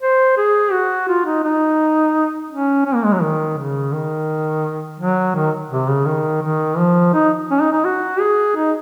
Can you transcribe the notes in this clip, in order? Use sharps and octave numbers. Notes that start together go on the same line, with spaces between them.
C5
G#4
F#4
F4
D#4
D#4
C#4
C#4
A#3
G#3
F#3
D#3
C#3
D#3
F#3
D#3
C3
C#3
D#3
D#3
F3
D#4
C#4
D#4
D#4
F#4
G#4
D#4